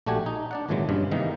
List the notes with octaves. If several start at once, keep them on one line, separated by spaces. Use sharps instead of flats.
A#1 A3 D4 F#4 G4 G#5
D#4
D4 D5 F#5
G#1 A#2 C#3 E3 F#3 G#3
G2 C#3 G#3
G#2 C3 D#3 E3 A#3 D#4